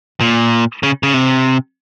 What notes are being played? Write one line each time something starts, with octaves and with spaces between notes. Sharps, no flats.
A#2
C#3
C#3
C3